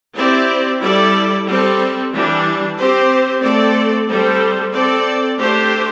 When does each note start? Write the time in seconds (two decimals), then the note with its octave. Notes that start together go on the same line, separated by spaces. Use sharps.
0.15 C4 E4 G4 D5
0.80 G3 E4 A4 D5
1.46 G3 C4 A4
2.12 E3 G3 D4
2.76 C4 G4 C5
3.42 A3 C4 A4 D5
4.08 G3 C4 A4 C5
4.73 C4 A4 D5
5.39 A3 D4 G4 C5